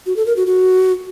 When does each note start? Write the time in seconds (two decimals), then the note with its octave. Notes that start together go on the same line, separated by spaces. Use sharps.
0.06 F#4
0.16 A4
0.26 A#4
0.36 F#4
0.46 F#4